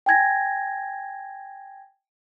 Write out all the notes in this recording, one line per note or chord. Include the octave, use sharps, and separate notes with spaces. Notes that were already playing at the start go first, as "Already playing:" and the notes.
G5 G#5 G#6 A#6